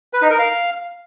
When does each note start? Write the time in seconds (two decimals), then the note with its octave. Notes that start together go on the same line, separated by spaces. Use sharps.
0.13 B4
0.22 D#4
0.30 A#4
0.39 F5